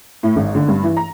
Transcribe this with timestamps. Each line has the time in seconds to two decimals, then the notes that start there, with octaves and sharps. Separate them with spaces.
0.23 A2
0.36 G#1
0.55 D3
0.68 G2
0.83 E3
0.97 A#5